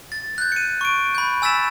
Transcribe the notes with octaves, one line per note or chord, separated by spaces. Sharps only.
A6
F#6 G6
C#7 D#7
C#6 D7
B5 G6
G#5 E6 A6 B6 E7